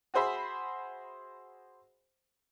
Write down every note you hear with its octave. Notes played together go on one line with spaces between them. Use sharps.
F#4 G#4 C5 E5 B5